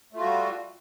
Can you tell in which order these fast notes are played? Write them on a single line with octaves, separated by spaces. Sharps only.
A3 F4 F#4 G3